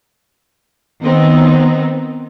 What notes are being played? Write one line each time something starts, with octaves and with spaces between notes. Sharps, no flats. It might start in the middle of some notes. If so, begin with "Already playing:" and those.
D#3 B3 C4 D#4